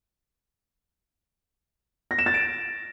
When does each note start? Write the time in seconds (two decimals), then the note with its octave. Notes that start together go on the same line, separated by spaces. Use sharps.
2.11 A#6
2.19 E7
2.26 A6
2.34 D7